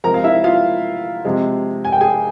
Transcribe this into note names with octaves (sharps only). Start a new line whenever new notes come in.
C3 F3 G#3 A#4 A#5
F5
E4 E5
F4 F5
C3 F3 G#3
G#5
G5
G#4 G#5